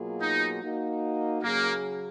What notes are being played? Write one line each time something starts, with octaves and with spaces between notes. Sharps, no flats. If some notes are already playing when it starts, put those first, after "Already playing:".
Already playing: B2 F#3 A#3 F4 G#4
D#4
A#3 D#4 F#4
C#3 F#3 A#3 C#4 G#4